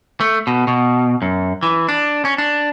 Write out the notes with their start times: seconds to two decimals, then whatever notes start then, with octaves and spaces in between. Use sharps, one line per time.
0.20 A3
0.47 B2
0.67 B2
1.22 F#2
1.63 E3
1.89 D4
2.25 C#4
2.38 D4